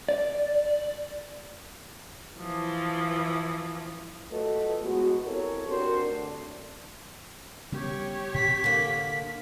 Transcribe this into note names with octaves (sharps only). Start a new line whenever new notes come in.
D5
E3 F3
F#3 A3 F4 A4 B4 D#5
A2 G#3 B3 F#4
C4 E4 G4 A4 A#4 C#5
C4 D4 F#4 G4 A#4 C5
D2 D4
C#3 G3 B3 G4 C#5
A2 C3 C4 B6
D3 A#3